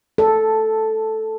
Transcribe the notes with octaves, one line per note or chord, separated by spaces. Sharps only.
A4